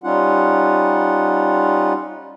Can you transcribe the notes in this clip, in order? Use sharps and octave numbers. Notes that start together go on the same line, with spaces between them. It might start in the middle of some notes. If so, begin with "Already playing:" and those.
G3 C#4 D#4 F4 F#5